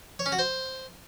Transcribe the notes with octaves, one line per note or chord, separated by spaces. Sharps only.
C#5
C#4
F#4
C5